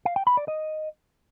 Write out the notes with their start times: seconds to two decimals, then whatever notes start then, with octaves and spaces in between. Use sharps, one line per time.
0.05 F5
0.16 G5
0.27 B5
0.37 D5
0.48 D#5